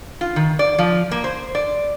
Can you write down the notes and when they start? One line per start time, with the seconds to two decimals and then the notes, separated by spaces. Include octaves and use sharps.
0.21 F4
0.36 D#3
0.59 D5
0.79 F3
1.11 A#3
1.24 C5
1.55 D5